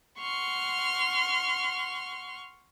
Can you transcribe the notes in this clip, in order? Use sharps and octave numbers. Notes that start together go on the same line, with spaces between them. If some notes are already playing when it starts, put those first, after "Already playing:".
F#5 C6 C#6 F6